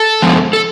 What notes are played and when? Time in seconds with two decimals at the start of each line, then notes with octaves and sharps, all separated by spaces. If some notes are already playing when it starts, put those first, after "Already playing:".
Already playing: A4
0.22 D3 F3 G#3 B3
0.53 A4